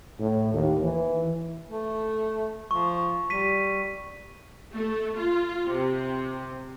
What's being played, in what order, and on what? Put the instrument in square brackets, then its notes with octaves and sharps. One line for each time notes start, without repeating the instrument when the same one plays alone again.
[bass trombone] A2
D#2
E3
[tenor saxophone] A3
[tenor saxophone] F3 [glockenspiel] C#6
[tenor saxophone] G3 [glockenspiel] B6 D#7
[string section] A3
F4
C3